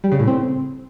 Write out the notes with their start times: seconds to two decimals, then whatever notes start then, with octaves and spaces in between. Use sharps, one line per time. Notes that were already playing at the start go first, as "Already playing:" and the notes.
0.04 G3
0.12 C#3
0.20 A2
0.27 C4